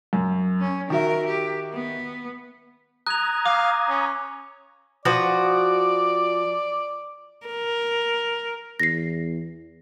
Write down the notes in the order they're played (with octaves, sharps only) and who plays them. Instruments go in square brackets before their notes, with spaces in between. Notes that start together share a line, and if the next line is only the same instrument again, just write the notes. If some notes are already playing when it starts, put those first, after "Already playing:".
[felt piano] F#2
[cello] C#4
[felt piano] D#3 F#4 E5 [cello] A#4
[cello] G4
B3
[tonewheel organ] A#5 D#6 G#6 [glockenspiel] F#6 F7
[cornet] F5 [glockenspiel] D6
[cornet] C#4
[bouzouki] F3 F#4 B4 [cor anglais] D5
[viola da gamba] A#4
[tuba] E2 [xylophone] A#6 C7